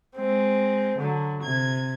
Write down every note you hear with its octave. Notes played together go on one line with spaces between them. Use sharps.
G#3 C4
D3 F#3
C3 G#6